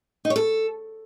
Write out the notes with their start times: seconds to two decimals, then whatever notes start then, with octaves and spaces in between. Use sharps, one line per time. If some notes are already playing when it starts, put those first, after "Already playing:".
0.25 D#4
0.30 C#5
0.36 A4